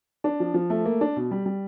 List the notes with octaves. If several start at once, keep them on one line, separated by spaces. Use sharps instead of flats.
D4
F3
F3
A3
A#3
D4
B2
G3
G3